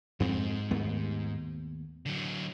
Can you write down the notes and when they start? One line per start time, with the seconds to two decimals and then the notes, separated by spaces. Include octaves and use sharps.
0.20 F2 G#2 A#3 C4
0.71 D#2 A3 B3
2.06 D3 F#3